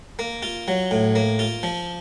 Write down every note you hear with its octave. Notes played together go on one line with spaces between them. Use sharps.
A#3
F4
F#3
A2
A#3
F4
F3